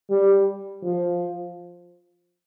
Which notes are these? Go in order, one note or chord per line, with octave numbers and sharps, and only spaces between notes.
G3
F3